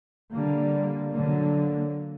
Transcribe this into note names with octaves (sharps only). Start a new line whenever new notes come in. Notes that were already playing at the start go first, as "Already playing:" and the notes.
D3 G3 A#3
D3 F#3 A#3